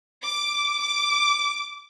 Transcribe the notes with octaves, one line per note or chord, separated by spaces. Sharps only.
D6
D6